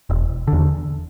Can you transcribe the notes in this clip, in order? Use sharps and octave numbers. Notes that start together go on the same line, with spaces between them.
E1
D3
E2